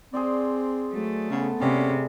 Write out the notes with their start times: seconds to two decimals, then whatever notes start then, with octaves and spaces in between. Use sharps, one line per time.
0.13 C4 G#4 C5 D5
0.93 F#3 A3
1.30 C#3 B3 A4 A5
1.61 C3 G3 C#4 G#4 F5